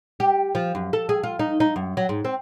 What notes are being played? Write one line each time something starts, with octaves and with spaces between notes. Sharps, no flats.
G4
F3
F#2
A4
G#4
F4
D#4
D#4
F#2
F#3
G#2
C4